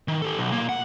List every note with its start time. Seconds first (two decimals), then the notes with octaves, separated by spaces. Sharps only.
0.08 D#3
0.22 G4 A4
0.38 B1
0.52 A#2 A#3
0.69 F#5